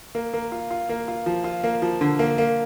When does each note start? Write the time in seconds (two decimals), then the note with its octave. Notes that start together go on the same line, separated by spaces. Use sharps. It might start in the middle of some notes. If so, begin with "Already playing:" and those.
0.15 A#3
0.33 A#3
0.52 F4
0.71 F4
0.89 A#3
1.08 F4
1.26 F3
1.44 F4
1.64 A#3
1.82 F3
2.01 D3
2.19 A#3
2.38 A#3